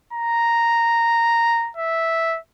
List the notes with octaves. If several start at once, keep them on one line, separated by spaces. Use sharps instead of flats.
A#5
E5